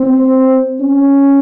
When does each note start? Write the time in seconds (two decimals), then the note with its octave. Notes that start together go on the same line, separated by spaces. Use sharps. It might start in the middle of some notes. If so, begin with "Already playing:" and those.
Already playing: C4
0.80 C#4